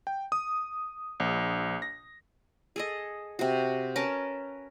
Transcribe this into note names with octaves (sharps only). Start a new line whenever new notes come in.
G5
D#6
A#1
A#6
G#4 A4 D#5
C3 F#4
C#4 A#4 B4 A5